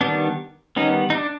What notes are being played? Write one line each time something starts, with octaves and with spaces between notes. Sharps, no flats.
D#3 G3 B3 D4
D#3 G3 B3 C#4 D#4
D#4
D4